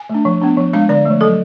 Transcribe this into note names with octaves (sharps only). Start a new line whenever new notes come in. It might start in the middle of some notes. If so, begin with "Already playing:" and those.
Already playing: G#5
A3 D4
F3
B3 D4
F3
G#3 D4 F5
D3 D5
F3 A3
F#3 A4